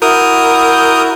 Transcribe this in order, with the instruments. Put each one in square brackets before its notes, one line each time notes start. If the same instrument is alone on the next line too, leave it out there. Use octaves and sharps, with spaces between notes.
[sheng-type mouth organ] E4 F#4 G6 [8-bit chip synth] A#4 D#6